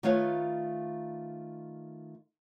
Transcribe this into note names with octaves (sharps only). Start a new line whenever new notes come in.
D#3 A3 F4 B4 C#5 F5